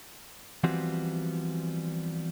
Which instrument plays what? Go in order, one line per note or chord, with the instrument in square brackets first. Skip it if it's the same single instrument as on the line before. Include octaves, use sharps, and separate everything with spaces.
[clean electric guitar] E3 F3 G3 B3 C4 F#4